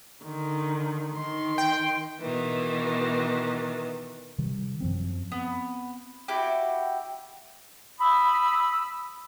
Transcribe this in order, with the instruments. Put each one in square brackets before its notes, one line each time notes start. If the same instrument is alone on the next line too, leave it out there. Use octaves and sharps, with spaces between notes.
[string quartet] D3 D#3
D#3 C6
[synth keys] G5
[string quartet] B2 D#3 E3
[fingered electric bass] C3 D#3 G3
F#2 F3 C4
[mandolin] B3 [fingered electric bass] C4
[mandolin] E4 F#4 G4
[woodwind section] B5 D#6 E6